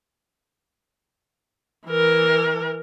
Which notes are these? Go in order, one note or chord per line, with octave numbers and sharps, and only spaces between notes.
E3 A#4